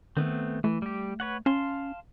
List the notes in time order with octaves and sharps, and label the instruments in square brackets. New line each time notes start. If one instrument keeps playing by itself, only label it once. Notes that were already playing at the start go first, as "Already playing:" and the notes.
[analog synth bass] D#3 [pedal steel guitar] A3 B3 C4
[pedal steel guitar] E3 [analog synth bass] A3
[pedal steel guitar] G3 G4
B4 C#5 F#5
[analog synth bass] C#4 [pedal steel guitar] F5 A5 C6